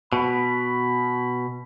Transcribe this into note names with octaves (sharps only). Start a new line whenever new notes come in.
B2 B5